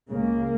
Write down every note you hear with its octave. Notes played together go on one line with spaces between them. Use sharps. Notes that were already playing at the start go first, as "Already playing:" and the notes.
C#2 C#3 A#3